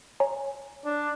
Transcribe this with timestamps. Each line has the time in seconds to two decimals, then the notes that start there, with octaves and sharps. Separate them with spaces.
0.20 C#5 G#5 A#5
0.85 D4